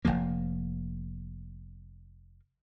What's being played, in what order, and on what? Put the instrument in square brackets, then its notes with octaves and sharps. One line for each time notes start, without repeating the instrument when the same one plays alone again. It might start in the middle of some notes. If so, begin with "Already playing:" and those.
[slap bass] F1 D#2 F3 A#3